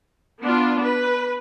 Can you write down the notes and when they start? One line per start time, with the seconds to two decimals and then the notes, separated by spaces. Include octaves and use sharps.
0.42 B3 D4 F4
0.84 B4